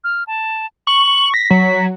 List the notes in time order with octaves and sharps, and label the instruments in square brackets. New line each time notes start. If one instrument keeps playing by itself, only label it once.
[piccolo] F6
A5
[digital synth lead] C#6 [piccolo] F#7
[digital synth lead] A#6 [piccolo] B6
[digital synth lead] F#3